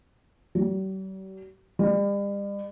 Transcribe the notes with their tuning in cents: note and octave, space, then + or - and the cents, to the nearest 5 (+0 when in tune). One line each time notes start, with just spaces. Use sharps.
G3 -45
G3 +40